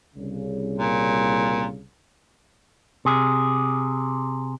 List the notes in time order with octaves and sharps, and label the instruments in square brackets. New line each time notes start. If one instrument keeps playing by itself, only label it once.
[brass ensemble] C2 C#3
[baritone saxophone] A#2
[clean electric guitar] C3 G#4